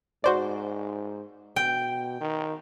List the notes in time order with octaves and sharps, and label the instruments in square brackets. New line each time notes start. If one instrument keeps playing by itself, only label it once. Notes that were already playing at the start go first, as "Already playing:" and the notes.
[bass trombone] G#2 [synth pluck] F#4 C5 D5
[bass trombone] B2 [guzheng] G5
[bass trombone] D#3